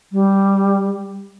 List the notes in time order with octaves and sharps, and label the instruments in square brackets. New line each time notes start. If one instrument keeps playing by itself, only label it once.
[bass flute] G3